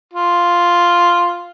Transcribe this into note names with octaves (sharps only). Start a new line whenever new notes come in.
F4